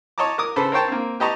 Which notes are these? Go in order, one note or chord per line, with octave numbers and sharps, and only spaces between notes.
C#5 D#5 A5 A#5 D6
A#4 D6 D#6
C#3 A4 B4 C5
A#4 C5 C#5 G5 A5
A#3 C4
G4 B4 D#5 A5 A#5 C#6